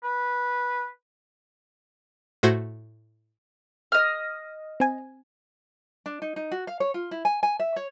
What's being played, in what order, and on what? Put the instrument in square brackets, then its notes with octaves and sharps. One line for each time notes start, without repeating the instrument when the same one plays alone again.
[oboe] B4
[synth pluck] A2 A3 F#4 C5 G#6 A#6
[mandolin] D#5 F6
[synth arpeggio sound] C4 G#5
[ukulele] D4
D#4
D#4
F#4
F5
C#5
F4
E4
G#5
G#5
E5
C#5